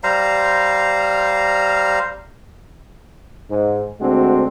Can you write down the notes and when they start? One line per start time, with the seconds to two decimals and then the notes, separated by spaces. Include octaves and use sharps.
0.04 G3 C5 F5 A#5
3.50 G#2
4.00 D2 G#3 C4 D4 F#4